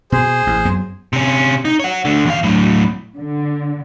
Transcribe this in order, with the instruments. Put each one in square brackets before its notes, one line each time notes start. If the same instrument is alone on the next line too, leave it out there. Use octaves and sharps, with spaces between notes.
[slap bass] B2 [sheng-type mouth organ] G#4 C5
[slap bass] A1
F#2 F#3 B3
[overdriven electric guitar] C3 C#4
D#4
C#5 F#5
D2 D3
E2 F5
A2 F#3
[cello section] D3